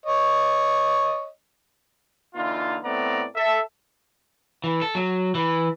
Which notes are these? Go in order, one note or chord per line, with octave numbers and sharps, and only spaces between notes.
C#5 D#5
D3 E3 A#3 D#4 F4
A2 A3 B3 C4 D5 A#5
A4 E5
E3
A4
F#3
E3